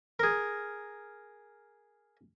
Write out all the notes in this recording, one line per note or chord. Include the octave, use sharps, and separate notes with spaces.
G#4 A#4